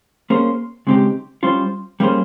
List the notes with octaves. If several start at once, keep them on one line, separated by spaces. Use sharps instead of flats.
A#3 C#4 G#4 C5
C#3 G#3 C4 D#4 G4
G3 C#4 F4 C5
G3 A#3 C#4 G#4 C5